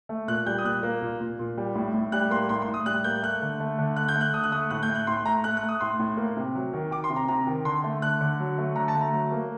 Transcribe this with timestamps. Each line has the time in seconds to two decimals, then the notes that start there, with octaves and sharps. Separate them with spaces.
0.09 A3
0.28 A#2 F#6
0.46 G3 G6
0.58 D#6
0.65 A#2 F#6
0.83 A#3
1.02 A#2
1.20 A#2
1.39 A#2
1.58 G3
1.75 A2
1.94 A2
2.12 G3 F#6
2.31 A#3 C6
2.49 A2 C6
2.62 C6
2.68 A2
2.74 D#6
2.86 G3 F#6
3.04 A#3 G6
3.22 A3 F#6
3.42 D3
3.60 A3
3.78 D3
3.96 A3 F#6
4.08 G6
4.16 A3
4.21 F#6
4.34 D3 D#6
4.43 F#6
4.52 A3 D#6
4.70 A2 F#6
4.83 G6
4.89 A3
4.95 F#6
5.07 A2 C6
5.25 A3 A#5
5.44 A3 F#6
5.57 F#6
5.63 A3
5.69 D#6
5.81 A2 C6
5.99 A2
6.17 A#3
6.37 C3
6.55 F#3
6.73 D#3
6.91 D#3 D6
7.04 C6
7.10 C3
7.16 A#5
7.28 C3 A#5
7.47 D#3
7.65 D3 C6
7.84 A3
8.02 D3 F#6
8.21 D3
8.40 F#3
8.58 A3
8.76 D3 A#5
8.88 A5
8.95 A3
9.01 A#5
9.13 F#3
9.32 A#3